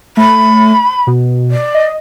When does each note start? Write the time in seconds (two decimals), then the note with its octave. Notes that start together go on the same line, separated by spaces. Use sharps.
0.17 A3 B5
1.07 B2
1.51 D5
1.75 D#5